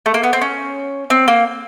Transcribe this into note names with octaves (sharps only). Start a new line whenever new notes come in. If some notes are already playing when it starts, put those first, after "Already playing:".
A3
A#3
B3
C4
C#4
C4
A#3